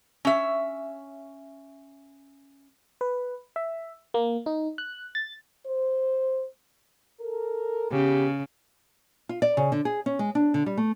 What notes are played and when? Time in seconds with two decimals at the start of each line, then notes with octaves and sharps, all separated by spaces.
0.25 C#4 E5
3.01 B4
3.56 E5
4.14 A#3
4.46 D#4
4.78 F#6
5.15 A6
5.65 C5
7.20 A4 A#4
7.91 C#3 B3 G4
9.29 F4
9.42 D5
9.57 C#3
9.72 D3
9.85 G#4
10.06 C#4
10.19 G#3
10.35 D4
10.54 D3
10.66 G3
10.78 A3